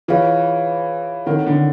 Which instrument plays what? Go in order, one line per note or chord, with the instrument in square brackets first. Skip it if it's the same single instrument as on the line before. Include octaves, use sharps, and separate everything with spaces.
[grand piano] E3 [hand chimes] F4 G#4 C#5 F5
[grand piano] D#3 [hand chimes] C4 E4 A4 C#5 F#5
[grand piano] D3